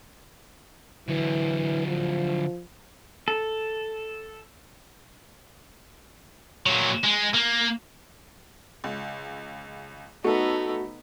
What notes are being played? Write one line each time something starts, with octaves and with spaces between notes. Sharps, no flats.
D3 E3 F#3
F3
A4
A#2 F#3
G#3
A#3
C#2
A3 B3 D#4 F#4 A4